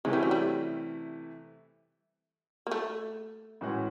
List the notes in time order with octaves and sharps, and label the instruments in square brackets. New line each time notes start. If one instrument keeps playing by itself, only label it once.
[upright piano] C3 E3 A3 C#4 E4 [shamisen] G#3
[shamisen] G3
F#3
G3
A#3
A3
[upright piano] A2 E3 G#3 C#4 F#4